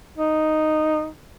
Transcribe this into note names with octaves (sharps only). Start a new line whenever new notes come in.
D#4